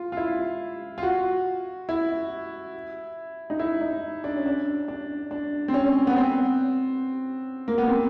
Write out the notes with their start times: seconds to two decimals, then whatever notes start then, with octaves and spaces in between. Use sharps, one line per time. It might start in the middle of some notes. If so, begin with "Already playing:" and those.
Already playing: F4
0.12 F4
0.17 E4
0.98 F4
1.03 F#4
1.89 E4
3.50 D#4
3.59 E4
3.81 D#4
4.24 D4
4.36 C#4
4.46 D4
4.88 D4
5.31 D4
5.68 C4
5.74 C#4
6.07 B3
6.17 C4
7.68 A#3
7.78 B3
7.88 C4